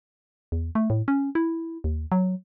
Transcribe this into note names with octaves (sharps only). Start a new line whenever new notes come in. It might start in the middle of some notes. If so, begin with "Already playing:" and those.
E2
A3
A2
C#4
E4
D#2
F#3